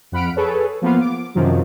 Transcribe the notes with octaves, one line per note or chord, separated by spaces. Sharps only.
F2 F#5 B5 F6 D7
G#4 A4 B4 C#5
F3 A#3 B3 F4 F5
D6
F#2 C3 D#3 F3 F#3